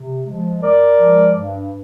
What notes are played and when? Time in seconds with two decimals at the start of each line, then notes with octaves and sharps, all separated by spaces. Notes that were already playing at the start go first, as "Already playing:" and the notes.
Already playing: C3
0.25 F3 G#3
0.61 G2 A#4 D5
0.98 F3 G#3
1.34 G2